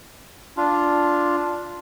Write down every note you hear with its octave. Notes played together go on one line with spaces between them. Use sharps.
D4 F4